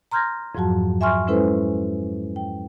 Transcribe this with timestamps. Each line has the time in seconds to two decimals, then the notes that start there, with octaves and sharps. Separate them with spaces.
0.11 A#5 C6 F6 G6 G#6 A#6
0.55 F2 G#2 F3 F#3 F#4 A5
1.01 E5 G#5 C6 C#6 F6
1.27 G#3 C#4 E4 A4 B4 C5
2.36 G5